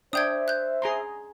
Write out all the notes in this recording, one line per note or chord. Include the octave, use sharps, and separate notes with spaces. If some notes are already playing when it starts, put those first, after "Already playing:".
D4 C5 E5 G5 D#6 G6 G#6
F#6 G6
G#4 A#5 C6